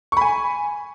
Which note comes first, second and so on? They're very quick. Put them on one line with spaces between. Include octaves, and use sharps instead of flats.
C#6 B5 G#5